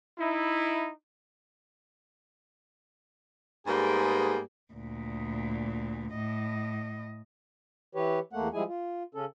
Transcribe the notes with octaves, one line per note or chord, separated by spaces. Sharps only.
D#4 E4
G#2 G3 A#3 B3 G4 G#4
D2 A#2
A2 D#5
E3 G4 B4 C#5
E2 A3 A#3 F#5
F3 G3 G#3 E4 G#4 G#5
F4
C#3 C#4 A4